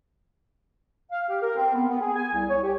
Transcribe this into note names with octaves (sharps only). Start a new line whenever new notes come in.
F5
G4
A#4
C4
B3
B3
G#4
G#5
C2
C#5
G4